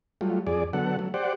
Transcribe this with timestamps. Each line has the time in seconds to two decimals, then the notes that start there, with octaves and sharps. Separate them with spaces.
0.21 F#3 G3 A3 F4
0.47 F2 G#4 D5
0.73 D3 F#3 B3 A4 F#5
0.99 F#3 A3
1.14 G4 C5 D5 F#5